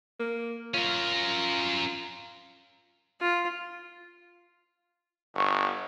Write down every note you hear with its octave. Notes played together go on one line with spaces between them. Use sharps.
A#3
C#4 F4 A#4
F4
G1 C#6